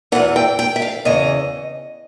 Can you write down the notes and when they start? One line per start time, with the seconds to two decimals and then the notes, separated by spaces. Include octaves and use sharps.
0.12 E2 C#3 E3 F#5
0.36 G5
0.59 G5
0.76 E5
0.82 F5
1.05 E2 C#3 E3 D#5